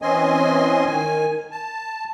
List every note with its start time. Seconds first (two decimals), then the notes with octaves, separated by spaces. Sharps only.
0.02 E3 C4 C#4 D#5 G#5 C6
0.86 D#3 G#5
1.52 A5